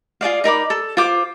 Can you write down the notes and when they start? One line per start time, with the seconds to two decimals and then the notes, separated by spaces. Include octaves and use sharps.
0.21 F4 G#4 D5 F5
0.44 D#4 A#4 B5 D6
0.70 A4
0.97 F4 C5 D6